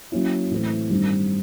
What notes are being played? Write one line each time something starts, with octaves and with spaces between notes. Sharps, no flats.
F#3 A#3 C#4 E4
A2 E3 A3 C4
G2 D#3 G3 C4